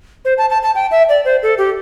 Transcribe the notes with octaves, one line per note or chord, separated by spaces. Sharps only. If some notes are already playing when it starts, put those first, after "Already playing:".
C5
A5
A5
A5
G5
E5
D5
C5
A4
G4